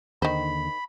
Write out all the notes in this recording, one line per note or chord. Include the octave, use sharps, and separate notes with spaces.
D#2 D3 D#3 C5 B5